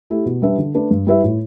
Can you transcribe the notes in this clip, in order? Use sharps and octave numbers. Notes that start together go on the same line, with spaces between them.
A3 E4 G4
B2
G3 D4 B4 E5
D3
A3 D4 B4
G2
G3 E4 B4 E5
A2